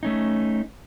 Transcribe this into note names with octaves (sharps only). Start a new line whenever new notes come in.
A3 C#4 D#4